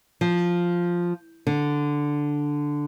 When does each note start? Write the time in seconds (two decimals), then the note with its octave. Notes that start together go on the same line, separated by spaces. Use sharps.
0.21 F3
1.47 D3